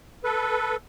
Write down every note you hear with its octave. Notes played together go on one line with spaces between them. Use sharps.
A4 B4